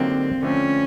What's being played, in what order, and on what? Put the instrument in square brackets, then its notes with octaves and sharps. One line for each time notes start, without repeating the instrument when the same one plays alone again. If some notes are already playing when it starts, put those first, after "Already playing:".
Already playing: [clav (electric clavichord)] D3 F#3 A#3 D#4 G4 [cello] C4
[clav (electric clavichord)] D3 F3 A3 C4 [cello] C#4